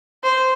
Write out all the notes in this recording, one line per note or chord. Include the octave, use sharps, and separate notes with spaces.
C5